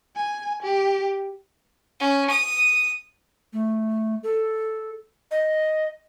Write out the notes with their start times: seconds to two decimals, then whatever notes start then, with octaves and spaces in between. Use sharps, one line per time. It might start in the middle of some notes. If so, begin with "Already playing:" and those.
0.16 G#5
0.62 G4
2.00 C#4
2.30 D#6
3.53 A3
4.23 A4
5.31 D#5